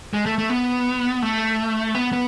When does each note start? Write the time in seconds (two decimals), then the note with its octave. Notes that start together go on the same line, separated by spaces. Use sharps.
0.13 G#3
0.26 A3
0.38 A3
0.50 B3
1.22 A3
1.95 B3
2.13 B3